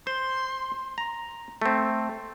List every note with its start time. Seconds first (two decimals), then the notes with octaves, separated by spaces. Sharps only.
0.07 C5 C6
0.98 A#5
1.62 A3 C4